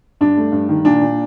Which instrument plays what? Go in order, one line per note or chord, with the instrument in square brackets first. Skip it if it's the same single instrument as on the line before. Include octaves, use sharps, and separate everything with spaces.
[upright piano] G2 D4
A3
G2
D#3
A#2 D4
A#2